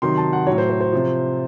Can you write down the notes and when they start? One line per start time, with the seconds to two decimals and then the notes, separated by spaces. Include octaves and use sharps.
0.02 C3 D#3 F#3 C6
0.17 A5
0.33 F#5
0.47 A2 F#3 C#5
0.58 C5
0.70 C5
0.81 C5
0.92 C3 F3